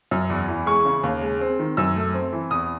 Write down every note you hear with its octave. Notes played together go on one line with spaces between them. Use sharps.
F#2
E2
E3
G#3 C#6
C#3
D#2
G#3
C4
D#3
F#2 E6
A3
C4
E3
E2 D#6